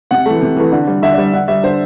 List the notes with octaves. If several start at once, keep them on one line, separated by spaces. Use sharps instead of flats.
C3 F#5
E3 A3
C3
E3 A3
D3
G3
D3 E5
D5
G3
D3 F#5
G3 E5
D3 C5